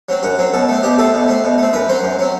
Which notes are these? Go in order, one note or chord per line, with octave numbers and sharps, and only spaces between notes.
F#3 C4
F#2 F#4
F#3 C4
B2 A4
A3 C4
B2 G4
A3 C4 A4
B2
A3 C4
B2
A3 C4
F#2 B4
F#3 C4 C5
F#2
F#3 C4